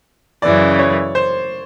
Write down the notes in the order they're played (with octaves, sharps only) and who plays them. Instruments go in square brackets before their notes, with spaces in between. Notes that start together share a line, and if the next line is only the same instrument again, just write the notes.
[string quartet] F#2 C#3 E3 [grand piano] D5
[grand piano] C#5
C5